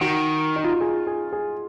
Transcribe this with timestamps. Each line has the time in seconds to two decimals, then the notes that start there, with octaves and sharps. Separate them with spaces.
0.01 D#3 F#4
0.56 D#4
0.64 F4
0.71 F#4
0.81 G#4
1.07 G#4
1.33 G#4